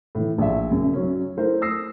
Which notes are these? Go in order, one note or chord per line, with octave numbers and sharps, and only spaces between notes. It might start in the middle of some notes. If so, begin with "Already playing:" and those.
A2 E3
A#1 D5 E5
F#2 C#3
F#3 C#4
A3 E4 A#4 C5
D#6 E6 A#6 C7